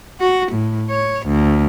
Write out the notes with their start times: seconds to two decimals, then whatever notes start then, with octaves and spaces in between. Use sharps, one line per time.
0.21 F#4
0.52 A2
0.90 C#5
1.26 D2